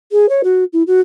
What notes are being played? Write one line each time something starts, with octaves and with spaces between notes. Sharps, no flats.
G#4
C#5
F#4
E4
F#4